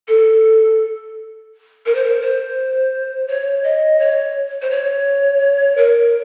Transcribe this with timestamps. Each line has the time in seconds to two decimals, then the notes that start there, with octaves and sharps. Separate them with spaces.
0.08 A4
1.86 A#4
1.95 C5
2.04 A#4
2.22 C5
3.28 C#5
3.64 D#5
3.99 C#5
4.62 C5
4.70 C#5
5.77 A#4